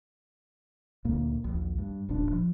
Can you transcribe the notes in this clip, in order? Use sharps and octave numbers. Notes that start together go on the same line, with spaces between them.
D2 A#2 A#3
A#1 D#2
G2
D#1 A1 A#2 D4
F3